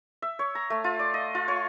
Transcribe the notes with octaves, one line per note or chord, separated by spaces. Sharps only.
E5
C#5
A#5
A3
F4
D5
D#5
F4
C#5